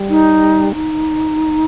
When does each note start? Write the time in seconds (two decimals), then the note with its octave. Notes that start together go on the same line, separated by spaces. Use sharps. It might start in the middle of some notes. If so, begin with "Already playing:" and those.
Already playing: G3
0.10 D#4
0.73 D#4